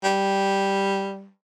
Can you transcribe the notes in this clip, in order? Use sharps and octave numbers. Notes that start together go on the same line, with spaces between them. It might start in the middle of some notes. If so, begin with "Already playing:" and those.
G3